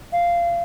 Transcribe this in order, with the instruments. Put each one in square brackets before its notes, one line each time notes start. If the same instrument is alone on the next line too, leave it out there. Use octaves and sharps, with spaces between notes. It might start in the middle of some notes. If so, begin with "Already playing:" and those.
[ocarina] F5